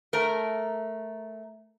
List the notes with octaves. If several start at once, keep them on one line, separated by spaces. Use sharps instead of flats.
A3 A#4